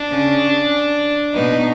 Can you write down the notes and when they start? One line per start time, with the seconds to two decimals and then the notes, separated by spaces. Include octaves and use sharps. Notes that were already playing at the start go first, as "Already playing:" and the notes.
Already playing: D4
0.09 C#3 C#4
1.34 B2 B3 D#4